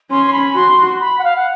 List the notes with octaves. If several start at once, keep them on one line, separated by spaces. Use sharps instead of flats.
C#4 C6
C6
B5
F#4 C6
C6
B5
F#5
F5
F#5